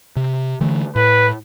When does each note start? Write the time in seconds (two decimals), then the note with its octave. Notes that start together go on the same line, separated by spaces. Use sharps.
0.16 C3
0.61 D3 E3 A3
0.96 A2 B4